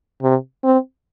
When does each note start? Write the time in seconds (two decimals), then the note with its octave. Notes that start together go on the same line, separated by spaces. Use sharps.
0.22 C3
0.64 C4